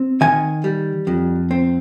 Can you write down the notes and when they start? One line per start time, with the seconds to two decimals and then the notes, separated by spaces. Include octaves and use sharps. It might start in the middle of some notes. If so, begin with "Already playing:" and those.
Already playing: C4
0.21 D#3 G#5
0.64 G3
1.07 F2
1.51 C4